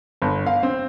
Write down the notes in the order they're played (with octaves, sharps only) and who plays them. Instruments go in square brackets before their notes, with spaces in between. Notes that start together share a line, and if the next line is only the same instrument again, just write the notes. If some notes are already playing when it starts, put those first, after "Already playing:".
[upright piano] G1
F5
C4